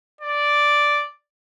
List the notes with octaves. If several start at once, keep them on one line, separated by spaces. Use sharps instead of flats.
D5